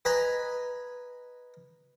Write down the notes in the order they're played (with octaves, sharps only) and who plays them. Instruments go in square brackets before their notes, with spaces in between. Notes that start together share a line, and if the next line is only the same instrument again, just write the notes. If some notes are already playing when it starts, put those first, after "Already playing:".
[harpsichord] B4 D#5 G#5 A#5 B5